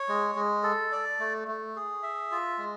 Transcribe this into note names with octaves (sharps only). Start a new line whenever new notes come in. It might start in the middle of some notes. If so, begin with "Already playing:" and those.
Already playing: C#5
G#3
G#3
A4
D5
A3
A3
G#4
E5
F4
G#3